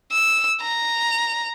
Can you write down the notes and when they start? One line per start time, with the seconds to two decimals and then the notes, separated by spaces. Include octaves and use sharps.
0.12 E6
0.61 A#5